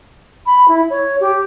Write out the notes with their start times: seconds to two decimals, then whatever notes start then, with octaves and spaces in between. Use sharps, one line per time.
0.46 B5
0.68 E4
0.90 C#5
1.20 G4